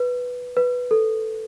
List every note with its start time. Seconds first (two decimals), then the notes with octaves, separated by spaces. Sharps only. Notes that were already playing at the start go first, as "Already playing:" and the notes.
Already playing: B4
0.57 B4
0.91 A4